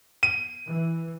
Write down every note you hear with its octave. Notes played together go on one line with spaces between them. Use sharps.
D#7
E3